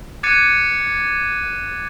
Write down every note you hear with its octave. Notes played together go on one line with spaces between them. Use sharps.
D6 F#6 G#6 A6 C#7 D#7